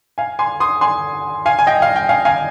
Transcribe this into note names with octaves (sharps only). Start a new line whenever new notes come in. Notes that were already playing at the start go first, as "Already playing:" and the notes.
F5 G#5
G#5 C6
C6 D#6
G#5 C6
F5 G#5
G#5
D#5 G5
F5
G5
F5 G#5
F5 G#5